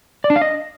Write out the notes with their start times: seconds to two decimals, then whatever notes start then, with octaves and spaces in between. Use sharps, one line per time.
0.24 D5
0.30 D4
0.36 F5
0.42 D#5